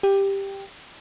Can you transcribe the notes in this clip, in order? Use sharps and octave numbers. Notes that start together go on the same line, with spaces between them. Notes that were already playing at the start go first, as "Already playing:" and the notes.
G4